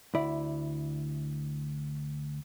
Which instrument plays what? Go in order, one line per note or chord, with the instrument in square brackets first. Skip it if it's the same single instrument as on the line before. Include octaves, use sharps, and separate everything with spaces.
[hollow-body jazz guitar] D2 E4 D5